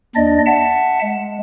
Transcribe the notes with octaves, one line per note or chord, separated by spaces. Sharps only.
D#2 D4 D5 D#5
E5 F#5 A5
G#3